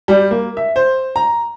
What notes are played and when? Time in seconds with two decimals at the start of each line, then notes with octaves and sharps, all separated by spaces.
0.08 G3
0.31 A#3
0.57 E5
0.76 C5
1.16 A#5